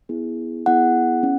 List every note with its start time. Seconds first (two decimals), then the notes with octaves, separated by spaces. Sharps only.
0.09 B3 E4 G#4
0.66 B3 E4 G#4 F#5
1.23 C#4